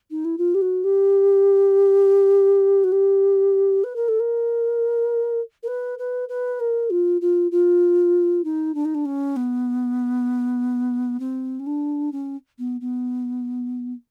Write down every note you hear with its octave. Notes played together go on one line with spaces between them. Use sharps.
D#4
E4
F4
G4
F#4
G4
F#4
G4
B4
A#4
A4
A#4
A#4
B4
B4
B4
A#4
F4
F4
F4
D#4
D4
D#4
D4
C#4
B3
C4
C#4
D4
C#4
B3
B3